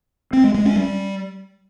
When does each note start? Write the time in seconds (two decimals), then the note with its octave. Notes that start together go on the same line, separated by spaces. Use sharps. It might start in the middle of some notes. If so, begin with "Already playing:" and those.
0.33 C4
0.44 G#3
0.54 G#3
0.65 C#4
0.76 G3